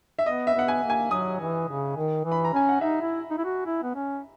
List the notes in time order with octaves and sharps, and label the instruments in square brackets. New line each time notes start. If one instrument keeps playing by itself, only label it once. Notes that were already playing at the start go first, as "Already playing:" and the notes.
[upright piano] E5
[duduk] B3 [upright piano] D#5
[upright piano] E5
[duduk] B3 [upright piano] F#5
[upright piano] G#5
[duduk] A#3
[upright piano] G#5
[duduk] F#3 [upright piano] D#6
[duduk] E3
C#3
D#3
E3
[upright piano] B5
A#5
[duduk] C#4 [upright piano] G#5
[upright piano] F#5
[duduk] D#4 [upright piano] E5
[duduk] E4
D#4
E4
F#4
E4
B3
C#4